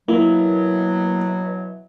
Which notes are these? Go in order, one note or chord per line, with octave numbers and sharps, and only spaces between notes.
B2 E3 F#3 A#3 E4